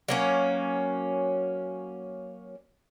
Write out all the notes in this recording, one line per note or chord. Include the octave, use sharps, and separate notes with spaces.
F#3 A#3 C#4